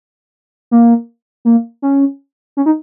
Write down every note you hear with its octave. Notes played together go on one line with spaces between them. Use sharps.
A#3
A#3
C#4
C#4
D#4